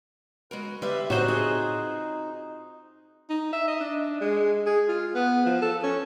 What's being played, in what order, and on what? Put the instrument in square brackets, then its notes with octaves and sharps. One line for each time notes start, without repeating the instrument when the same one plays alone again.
[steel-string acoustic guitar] G#3 F#4 A#4 [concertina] B4
[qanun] G3 [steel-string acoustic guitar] B4 E5 [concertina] C6 E6
[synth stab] A2 C#5 F#6 [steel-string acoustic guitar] C4 F4 [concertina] D#4 [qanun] F#4 C5
[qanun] G#4 [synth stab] D#6
[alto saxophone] D#4
E5
D#5
D4
G#3
G#4
F4
B3
F3
A4
C#4